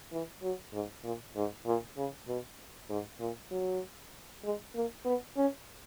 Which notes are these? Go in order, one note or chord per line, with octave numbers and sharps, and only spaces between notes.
E3
F#3
G#2
A#2
G#2
A#2
C#3
B2
G#2
A#2
F#3
G#3
A#3
B3
C#4